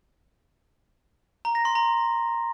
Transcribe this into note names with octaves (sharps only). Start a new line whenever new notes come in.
A#5
A#6
C6
A#5